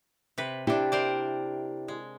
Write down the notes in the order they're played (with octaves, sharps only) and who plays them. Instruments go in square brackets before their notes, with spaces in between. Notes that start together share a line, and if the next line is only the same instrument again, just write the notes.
[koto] C3 B4
[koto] C3 D4 [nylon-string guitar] E4 G4
[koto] A#4 C5 D5
G#3